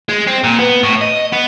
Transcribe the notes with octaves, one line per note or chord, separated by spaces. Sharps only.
G#3
C4
A#2
B3
A2
D#5
B3